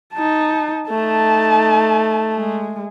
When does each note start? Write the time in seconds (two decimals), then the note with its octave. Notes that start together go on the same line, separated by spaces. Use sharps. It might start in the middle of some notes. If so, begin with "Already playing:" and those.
0.14 D#4 A5
0.89 A3 D#4 A5
2.34 G#3